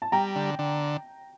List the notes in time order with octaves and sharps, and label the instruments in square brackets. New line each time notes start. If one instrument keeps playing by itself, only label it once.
[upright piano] A5
[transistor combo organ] G3 [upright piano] G5 A#5
[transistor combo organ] D3
D3